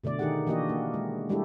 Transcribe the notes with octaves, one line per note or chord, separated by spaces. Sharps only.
B2 D3 A3 D5
D#3 D#4 G4 G#4 F#5
E3 A#3 D4 F#4 G4 D#5
A#3
G#3
G3 G#3 D4 E4 G4 A4